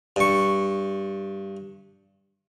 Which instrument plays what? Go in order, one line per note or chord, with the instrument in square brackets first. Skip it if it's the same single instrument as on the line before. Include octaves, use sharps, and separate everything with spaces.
[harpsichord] G2 C#6